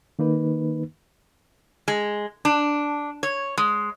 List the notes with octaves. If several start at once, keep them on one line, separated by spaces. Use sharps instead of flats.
D#3 A#3 D#4 B4
G#3
D4
C#5
G#3